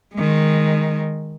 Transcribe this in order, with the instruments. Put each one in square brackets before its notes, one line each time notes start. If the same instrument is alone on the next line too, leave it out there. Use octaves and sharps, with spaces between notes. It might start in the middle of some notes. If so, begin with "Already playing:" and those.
[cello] D#3 G#3